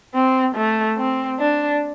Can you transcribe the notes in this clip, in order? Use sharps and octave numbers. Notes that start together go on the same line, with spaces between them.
C4
A3
C4
D4